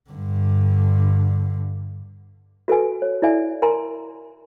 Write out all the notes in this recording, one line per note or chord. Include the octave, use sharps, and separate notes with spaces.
G2 D3
F#4 A4 B4 G#5
C#5
E4 A4 D5 E5 G#5
A#4 G#5 A#5 C6